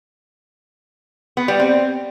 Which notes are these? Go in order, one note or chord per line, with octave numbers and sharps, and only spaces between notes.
B3
G3
C4